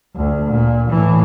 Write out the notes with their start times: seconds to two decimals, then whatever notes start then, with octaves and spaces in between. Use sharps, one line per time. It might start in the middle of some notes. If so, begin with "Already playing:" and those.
0.16 D2
0.50 A#2
0.89 A2 E3